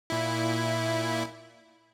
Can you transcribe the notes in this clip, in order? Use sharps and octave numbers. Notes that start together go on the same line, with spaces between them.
A#2 E4